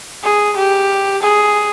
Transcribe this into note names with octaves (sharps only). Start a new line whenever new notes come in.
G#4
G4
G#4